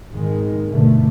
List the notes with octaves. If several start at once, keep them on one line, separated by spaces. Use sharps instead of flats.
G#1 D#3 G#3
G1 B2 D3 A3